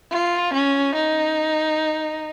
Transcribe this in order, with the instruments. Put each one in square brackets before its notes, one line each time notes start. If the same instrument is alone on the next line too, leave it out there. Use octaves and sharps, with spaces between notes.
[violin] F4
C#4
D#4